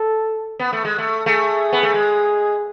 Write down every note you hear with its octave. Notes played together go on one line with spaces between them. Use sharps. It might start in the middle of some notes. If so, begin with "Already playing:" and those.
Already playing: A4
B3
A3
G#3
A3
A3 G#4
B3
A3
G#3